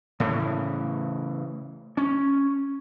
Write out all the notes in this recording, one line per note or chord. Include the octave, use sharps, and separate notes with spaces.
A2 C#3 E3
C#4